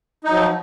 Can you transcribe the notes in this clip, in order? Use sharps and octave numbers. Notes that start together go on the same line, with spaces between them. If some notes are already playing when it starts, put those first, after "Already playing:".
F3 F#3 D#4